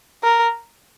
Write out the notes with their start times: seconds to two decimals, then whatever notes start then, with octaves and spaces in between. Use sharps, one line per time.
0.23 A#4